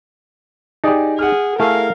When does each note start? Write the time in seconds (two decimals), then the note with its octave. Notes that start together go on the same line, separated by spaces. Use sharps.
0.84 D#4 G4 G#4 D5
1.19 G#4 F#5 F6
1.59 A3 E4 G#4 A#4 F5